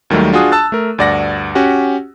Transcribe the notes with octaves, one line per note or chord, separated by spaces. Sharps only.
D#2 D#3 F#3 G3 A3
D4 F4 F#4 G#4 D#6
A5 E6 F#6 A6
A3 A#4
D2 G2 D5 F#5 A#6
C#4 F#4 G4 F#5